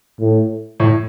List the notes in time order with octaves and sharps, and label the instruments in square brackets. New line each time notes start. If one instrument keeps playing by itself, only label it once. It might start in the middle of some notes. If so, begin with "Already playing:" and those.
[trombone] A2
[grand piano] A2